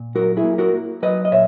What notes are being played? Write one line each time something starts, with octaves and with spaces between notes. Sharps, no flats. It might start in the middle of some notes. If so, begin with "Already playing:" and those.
Already playing: A#2
F#3 F#4 A#4
E4 G#4
A#3
F#4 A#4
A#3
F#3 B4 D#5
D#5
A#2 C#5 E5